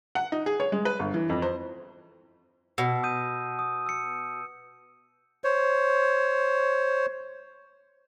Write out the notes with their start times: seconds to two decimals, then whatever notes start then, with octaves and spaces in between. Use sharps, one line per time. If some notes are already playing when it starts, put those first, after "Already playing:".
0.15 F#5
0.32 D#4
0.46 G#4
0.60 C#5
0.72 G#3
0.85 B4
0.99 G1
1.14 E3
1.30 F2
1.42 C5
2.78 B2 E6
3.03 D#6 G6 D#7
3.59 D#6
3.86 E6 C#7
5.44 C5 C#5